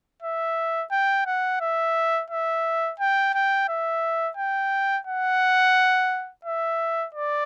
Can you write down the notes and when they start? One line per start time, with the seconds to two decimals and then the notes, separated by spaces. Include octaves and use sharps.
0.23 E5
0.91 G5
1.26 F#5
1.61 E5
2.30 E5
3.00 G5
3.34 G5
3.68 E5
4.37 G5
5.07 F#5
6.45 E5
7.15 D5